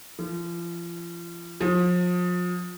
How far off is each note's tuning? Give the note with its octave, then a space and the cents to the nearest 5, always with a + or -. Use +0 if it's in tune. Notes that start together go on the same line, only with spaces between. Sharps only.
F3 -35
F3 +35